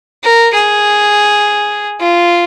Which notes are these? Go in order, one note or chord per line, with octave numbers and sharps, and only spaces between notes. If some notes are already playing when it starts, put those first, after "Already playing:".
A#4
G#4
F4